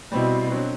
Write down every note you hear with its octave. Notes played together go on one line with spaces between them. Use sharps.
B2 G3 C4 E4
D3 F#3 C4